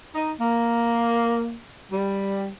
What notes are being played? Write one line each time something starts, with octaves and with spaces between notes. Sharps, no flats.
D#4
A#3
G3